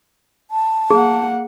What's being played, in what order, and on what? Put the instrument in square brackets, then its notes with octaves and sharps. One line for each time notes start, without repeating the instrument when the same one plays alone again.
[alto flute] A5
[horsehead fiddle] A#3 F#5 [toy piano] G#4